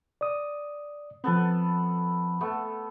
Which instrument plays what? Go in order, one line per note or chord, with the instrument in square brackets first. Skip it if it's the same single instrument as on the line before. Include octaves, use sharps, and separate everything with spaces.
[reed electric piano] D5 D#6
[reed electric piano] F3 C4 [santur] B3 A4 B4
[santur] A3 B3 A4